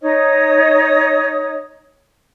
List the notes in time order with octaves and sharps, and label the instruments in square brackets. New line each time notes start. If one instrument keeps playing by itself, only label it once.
[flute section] D#4 C#5 D#5 D#6